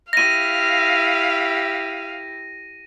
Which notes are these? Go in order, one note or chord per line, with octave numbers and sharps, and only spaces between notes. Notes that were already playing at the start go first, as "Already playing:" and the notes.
E4 G4 F5 A#6 D#7